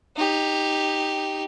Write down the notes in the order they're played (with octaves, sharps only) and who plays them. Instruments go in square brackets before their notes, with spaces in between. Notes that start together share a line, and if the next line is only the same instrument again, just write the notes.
[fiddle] D#4 G4